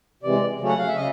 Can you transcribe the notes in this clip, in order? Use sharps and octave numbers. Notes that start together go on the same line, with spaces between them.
C3 E3 G#3 D5
C#3 F#3 A3 C#4
F#5
F5
E5
C#3 D#5